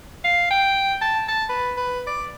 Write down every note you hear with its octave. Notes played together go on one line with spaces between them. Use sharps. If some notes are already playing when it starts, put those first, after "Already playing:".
F5
G5
A5
A5
B4
B4
D5